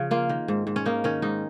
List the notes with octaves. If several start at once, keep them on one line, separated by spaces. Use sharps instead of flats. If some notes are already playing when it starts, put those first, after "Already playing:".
Already playing: C#3 F3 C#4
A#3 F4
D#3
G#2
G#2
C#4
A#3 D#4
D#3 C#4
G#2 D#4